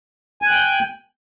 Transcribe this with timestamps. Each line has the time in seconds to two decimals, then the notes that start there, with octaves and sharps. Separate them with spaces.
0.42 G#5
0.46 F#6
0.51 G5
0.55 G6